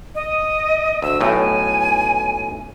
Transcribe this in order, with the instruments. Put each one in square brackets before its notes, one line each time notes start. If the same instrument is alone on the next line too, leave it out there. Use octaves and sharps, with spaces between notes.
[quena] D#5
[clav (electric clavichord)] D2 [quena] E6
[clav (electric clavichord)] B1 A2 [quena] G#5